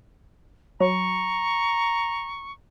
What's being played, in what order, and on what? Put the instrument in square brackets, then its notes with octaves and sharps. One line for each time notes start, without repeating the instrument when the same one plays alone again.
[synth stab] F#3 [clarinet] A#5 [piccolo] C#6